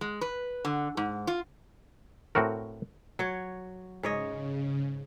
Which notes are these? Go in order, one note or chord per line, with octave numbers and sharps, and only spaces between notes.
G#3
B4
D3
G#2
F4
A2 C4 F#4 A#4
F#3 C#5
G#2 C#3 C#5 D#5